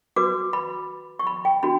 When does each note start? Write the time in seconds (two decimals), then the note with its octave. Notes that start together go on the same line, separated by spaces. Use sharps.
0.16 F#4 B4 D6
0.53 B5
1.19 C#6
1.27 B5
1.45 G5
1.63 D4 F#4 B5